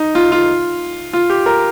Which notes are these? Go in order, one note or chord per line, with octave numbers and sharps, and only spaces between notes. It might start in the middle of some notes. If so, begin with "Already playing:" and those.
Already playing: D#4
F4
F4
F4
G4
A#4